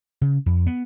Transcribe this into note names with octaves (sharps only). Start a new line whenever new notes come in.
C#3
F2
B3